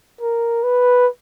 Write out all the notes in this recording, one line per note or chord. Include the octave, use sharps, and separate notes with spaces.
A#4
B4